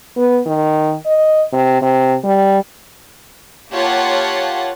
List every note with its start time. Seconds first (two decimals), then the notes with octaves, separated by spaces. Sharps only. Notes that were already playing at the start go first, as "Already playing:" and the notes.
0.16 B3
0.46 D#3
1.06 D#5
1.52 C3
1.82 C3
2.24 G3
3.71 A#3 F4 G4 C#5 F#5 A5